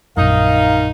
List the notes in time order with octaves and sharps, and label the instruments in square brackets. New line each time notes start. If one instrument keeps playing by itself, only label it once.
[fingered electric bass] A#1 F#2 [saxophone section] D#3 D#4 [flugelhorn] F5